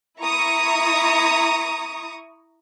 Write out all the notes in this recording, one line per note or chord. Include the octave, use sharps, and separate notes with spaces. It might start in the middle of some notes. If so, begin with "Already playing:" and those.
E4 A#5 C#6 D#6